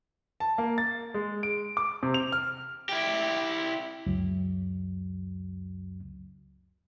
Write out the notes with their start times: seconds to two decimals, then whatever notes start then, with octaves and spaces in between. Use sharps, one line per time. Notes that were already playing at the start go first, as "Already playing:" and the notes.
0.40 A5
0.58 A#3
0.78 A6
1.14 G#3
1.43 D7
1.77 D6
2.03 C3
2.14 F7
2.32 F6
2.89 E4 G4
4.07 C#2 F#2 C#3 F#3